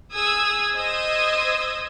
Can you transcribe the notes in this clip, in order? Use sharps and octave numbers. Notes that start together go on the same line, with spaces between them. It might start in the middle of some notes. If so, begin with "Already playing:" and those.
G#4 D#6 E6 G#6
C5 D#5 D#6 E6 G#6